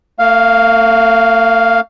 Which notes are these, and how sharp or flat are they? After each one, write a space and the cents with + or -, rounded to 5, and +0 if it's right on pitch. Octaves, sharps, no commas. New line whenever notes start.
A3 +45 F5 +0